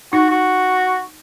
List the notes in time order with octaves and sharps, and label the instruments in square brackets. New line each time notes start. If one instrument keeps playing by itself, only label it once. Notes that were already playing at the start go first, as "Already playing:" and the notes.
[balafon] D#4 [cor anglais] F#4
[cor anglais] F#4